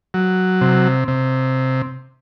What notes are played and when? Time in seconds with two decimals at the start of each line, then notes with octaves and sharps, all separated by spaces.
0.14 F#3
0.61 C3
1.08 C3